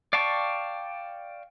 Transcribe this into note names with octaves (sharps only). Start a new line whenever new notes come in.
D5 F5 G5 A5 C#6